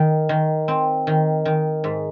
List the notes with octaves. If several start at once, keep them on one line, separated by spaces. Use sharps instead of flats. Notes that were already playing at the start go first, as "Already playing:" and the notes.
Already playing: D#3
D#3
C4
D#3
D#3
G#2